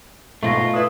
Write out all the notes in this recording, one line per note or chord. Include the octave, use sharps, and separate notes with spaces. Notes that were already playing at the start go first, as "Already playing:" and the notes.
G#2 B2 A3 F4 C#6 A#6
D4 E4 B4 D#6